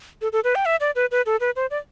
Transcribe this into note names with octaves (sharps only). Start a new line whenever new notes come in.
A4
A4
B4
G5
E5
D5
B4
B4
A4
B4
C5
D5